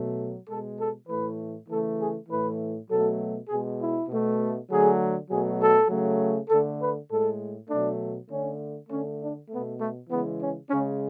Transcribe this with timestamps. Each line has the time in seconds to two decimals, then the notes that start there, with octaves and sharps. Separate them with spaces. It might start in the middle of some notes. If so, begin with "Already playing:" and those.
Already playing: B2 F#3 A3
0.48 B2 G#3 A4
0.78 A4
1.08 A2 E3 A3 B4
1.68 C#3 E3 A3 A4
1.98 G#4
2.29 A2 E3 A3 B4
2.89 B2 F#3 A3 A4
3.48 B2 G#3 G#4
3.79 E4
4.09 B2 A3
4.69 D3 F#3 A3 G#4
5.29 B2 F#3 A3 G#4
5.59 A4
5.89 C#3 F#3 A3
6.49 D3 A4
6.53 A3
6.79 B4
7.09 A2 G#3 A4
7.69 B2 F#3 A3 D4
8.29 D3 A3 C#4
8.89 D3 A3 C#4
9.19 D4
9.49 B2 A3 B3
9.80 A3
10.09 C#3 E3 G#3 B3
10.40 C#4
10.69 G#3 C#4
10.74 C#3